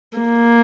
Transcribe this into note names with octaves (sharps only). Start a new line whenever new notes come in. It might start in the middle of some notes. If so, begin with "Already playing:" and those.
A#3